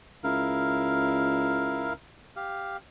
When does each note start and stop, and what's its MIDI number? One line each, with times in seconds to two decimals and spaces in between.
0.24 1.93 37
0.24 1.93 64
0.24 1.93 70
0.24 1.93 77
2.36 2.77 67
2.36 2.77 77